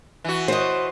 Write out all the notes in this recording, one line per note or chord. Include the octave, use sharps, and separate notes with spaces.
E3 F#4
C5 D#5